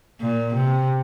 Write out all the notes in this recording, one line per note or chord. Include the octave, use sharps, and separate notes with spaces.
A#2
C3